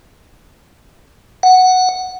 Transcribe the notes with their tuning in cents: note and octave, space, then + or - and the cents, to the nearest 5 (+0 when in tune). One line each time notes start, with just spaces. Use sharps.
F#5 +0